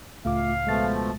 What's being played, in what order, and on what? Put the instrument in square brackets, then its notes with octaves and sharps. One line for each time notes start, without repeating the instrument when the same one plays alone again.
[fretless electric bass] C#2 A2 [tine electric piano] A3 F4 D6 [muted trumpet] F5
[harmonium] B2 F3 A3 [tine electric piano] G#3 A6